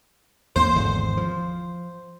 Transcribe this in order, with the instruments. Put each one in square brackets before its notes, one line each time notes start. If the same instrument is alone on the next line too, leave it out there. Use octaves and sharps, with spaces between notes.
[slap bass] E2 A#3 [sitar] C5
[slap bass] G#1 E2 D3
F3